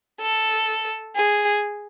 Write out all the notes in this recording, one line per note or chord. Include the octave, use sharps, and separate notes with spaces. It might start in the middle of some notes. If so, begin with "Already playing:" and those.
A4
G#4